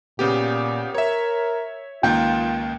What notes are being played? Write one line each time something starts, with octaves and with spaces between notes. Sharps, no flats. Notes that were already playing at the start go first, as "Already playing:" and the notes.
A#2 C#3 B3 G4
A#4 C#5 E5
C#2 D#3 A#3 F4 G5